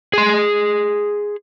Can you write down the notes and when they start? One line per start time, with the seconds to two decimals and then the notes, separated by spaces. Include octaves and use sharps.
0.13 G#4 C6